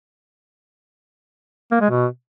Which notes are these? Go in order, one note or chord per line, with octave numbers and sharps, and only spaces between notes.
A#3
G#3
B2